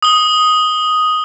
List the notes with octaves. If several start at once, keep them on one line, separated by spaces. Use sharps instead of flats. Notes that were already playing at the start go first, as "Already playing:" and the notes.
D#6 G7